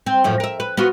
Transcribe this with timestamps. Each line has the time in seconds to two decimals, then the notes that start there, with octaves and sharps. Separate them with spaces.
0.06 C4
0.24 F#2 A2 F3
0.40 A#4 E5
0.60 B4
0.77 B3 F4 F#4